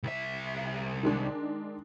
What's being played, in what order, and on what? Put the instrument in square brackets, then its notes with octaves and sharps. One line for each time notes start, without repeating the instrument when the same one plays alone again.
[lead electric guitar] C2 E5
[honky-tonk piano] D#3 G#3 D4